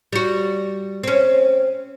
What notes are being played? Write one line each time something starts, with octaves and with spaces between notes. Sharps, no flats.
G3 F#4
C4 C#4